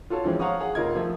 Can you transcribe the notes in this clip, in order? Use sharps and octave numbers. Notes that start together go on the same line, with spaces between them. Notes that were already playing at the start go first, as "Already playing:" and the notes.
F4 F#4 A4 C#5
E3 F3 G#3 C4 C#4
C#5 F5 F#5 A#5 C#6 D#6
G#4 F#5
F1 F4 A#4 D#5 G#6
F3 A3